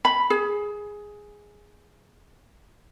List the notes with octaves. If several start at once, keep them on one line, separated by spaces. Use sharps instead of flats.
B5
G#4